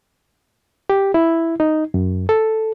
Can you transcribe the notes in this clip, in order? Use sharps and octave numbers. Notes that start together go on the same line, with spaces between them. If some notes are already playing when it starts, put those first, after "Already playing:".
G4
E4
D#4
F#2
A4